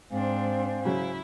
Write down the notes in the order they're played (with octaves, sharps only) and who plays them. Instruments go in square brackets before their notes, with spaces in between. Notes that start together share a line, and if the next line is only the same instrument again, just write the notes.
[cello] G#2 D4 [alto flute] C4 [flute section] C5 F5 G#5
[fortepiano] C#3 F#3 [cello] E4